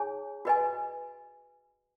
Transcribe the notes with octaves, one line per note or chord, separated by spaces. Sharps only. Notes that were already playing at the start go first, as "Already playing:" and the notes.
Already playing: D#4 G#4 C#5 G#5
F#4 B4 D#5 G#5